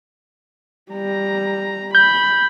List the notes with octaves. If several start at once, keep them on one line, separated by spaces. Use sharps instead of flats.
G3 A#5
B5 G6